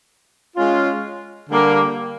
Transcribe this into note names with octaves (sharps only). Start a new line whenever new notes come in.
G#3 C#4 F4
D3 G3 A#3